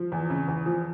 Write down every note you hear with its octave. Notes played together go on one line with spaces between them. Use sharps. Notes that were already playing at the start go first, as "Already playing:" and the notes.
Already playing: F3
E2
C#3
E2
F3